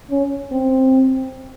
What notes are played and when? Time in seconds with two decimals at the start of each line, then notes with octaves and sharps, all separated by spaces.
0.11 C#4
0.52 C4